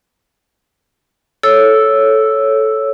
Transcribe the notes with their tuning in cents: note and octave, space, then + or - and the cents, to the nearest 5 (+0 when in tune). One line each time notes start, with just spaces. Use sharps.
A4 -10 C#5 +0 E6 +0